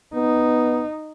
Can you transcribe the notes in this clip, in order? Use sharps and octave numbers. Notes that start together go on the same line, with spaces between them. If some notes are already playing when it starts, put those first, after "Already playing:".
B3 D#4